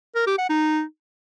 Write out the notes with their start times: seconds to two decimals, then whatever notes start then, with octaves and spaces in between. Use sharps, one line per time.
0.15 A#4
0.27 G4
0.38 F#5
0.50 D#4